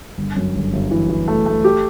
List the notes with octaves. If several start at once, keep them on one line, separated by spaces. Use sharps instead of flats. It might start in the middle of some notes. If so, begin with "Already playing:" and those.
G1
F#2
G1
G1
E3
E3
A3
A3
G4